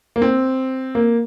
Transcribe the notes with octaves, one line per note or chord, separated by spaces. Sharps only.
A#3
C4
A#3